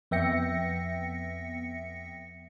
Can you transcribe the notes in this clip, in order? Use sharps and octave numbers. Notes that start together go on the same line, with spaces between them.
F2 B3 E5 G5 A#6 C#7